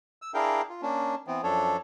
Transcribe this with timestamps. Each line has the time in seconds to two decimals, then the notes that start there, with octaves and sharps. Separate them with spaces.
0.22 E6
0.34 D4 E4 G#4 A#4 F5 G5
0.70 F4
0.82 A#3 C#4 D4
1.27 E3 B3 C4
1.43 F#2 F3 D4 A4 C#5